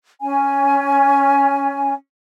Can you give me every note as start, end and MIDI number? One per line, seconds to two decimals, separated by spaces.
0.22 1.94 61
0.22 1.94 80